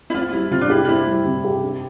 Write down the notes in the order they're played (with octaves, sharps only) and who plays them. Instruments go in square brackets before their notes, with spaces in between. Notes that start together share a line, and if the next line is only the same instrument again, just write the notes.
[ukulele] E4
[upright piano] C4 [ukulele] F4
[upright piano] G3 [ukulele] E4
[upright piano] C3 [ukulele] F4
[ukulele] D4
[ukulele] E4 [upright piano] G4
[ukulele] F4
[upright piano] C4 [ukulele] E4
[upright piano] G3
C3
G4
D4